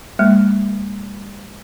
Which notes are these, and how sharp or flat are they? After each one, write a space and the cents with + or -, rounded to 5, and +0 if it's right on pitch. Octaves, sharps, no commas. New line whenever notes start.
G3 +45 A#3 -20